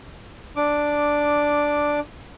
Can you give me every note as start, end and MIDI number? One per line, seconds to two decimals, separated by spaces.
0.56 2.00 62
0.56 2.00 86